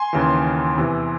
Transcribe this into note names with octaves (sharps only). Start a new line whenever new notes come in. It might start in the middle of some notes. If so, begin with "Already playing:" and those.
Already playing: G#5 C6
D#2 C#3 E3
E2 C3 E3